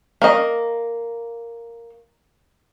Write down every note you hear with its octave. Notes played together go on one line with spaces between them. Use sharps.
A#3 D#5